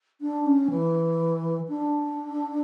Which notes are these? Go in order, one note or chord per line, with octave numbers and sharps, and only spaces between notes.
D4
C#4
E3
D4